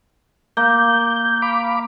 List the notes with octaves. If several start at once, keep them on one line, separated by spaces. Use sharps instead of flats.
A#3 G6
F5 B5 D6